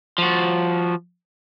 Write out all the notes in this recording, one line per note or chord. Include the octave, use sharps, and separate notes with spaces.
F3 F#4